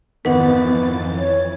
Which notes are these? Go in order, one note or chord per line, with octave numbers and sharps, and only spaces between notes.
G#1 F2 D#3 E3 B3 B4 F#5 A6
C#5